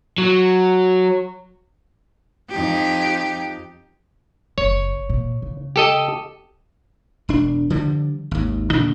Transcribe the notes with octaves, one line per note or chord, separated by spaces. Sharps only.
F#3
F2 D#4 G4
F#1 C#5
A#2
C#3
G4 A4 D#5
E1 D4
D3 F3 G3
G#1 D#2
A#2 D3 D4